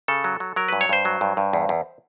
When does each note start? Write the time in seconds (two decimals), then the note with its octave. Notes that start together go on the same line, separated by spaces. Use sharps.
0.08 C#3 A4
0.24 F#3
0.40 F#3
0.56 F#3 A#4
0.68 G2 B4
0.81 C#5
0.89 G2 C5
1.05 F#3
1.21 G2
1.37 G2
1.53 E2
1.69 E2